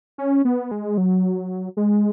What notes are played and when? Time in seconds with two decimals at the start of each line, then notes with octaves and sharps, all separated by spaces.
0.18 C#4
0.45 B3
0.71 G#3
0.98 F#3
1.77 G#3